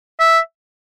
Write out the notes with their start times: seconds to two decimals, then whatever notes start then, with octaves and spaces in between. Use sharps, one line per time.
0.19 E5